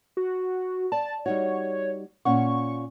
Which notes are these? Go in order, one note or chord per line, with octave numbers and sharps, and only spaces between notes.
F#4
D5 A5
G3 D#4 F#4 C#5
A#2 C#4 F#5 C#6